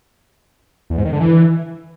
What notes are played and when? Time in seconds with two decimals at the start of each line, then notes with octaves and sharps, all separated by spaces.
0.90 E2
0.98 G#2
1.05 D#3
1.13 D3
1.20 E3